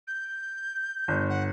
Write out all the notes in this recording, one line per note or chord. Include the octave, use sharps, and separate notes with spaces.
G6
G1
F#5